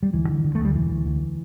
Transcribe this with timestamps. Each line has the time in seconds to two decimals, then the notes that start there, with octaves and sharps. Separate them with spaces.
0.03 G3
0.13 D2 E3
0.29 D3
0.44 D3
0.55 A3
0.59 D2
0.65 G3
0.74 E1 E3
0.90 D2
1.05 D2